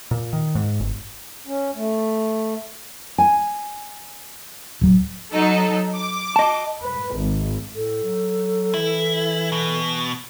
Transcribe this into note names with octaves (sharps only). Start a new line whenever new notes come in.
A#2
D#3
G#2
G1
C#4
A3
G#5
D1 F#3
F#3 D#4 A4
D6
D#5 A5
B4
G#1
A2 A4
F#3
E3 E4
B2